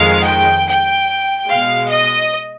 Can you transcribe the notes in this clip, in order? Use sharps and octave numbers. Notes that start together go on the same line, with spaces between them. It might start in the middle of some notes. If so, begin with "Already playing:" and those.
Already playing: F2 D#3 G#3 F5
G5
G5
B2 G#3 F5
D#5